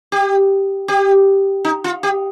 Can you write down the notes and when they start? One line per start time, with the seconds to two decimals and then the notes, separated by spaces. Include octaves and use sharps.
0.12 G4
0.88 G4
1.65 D#4
1.84 F4
2.03 G4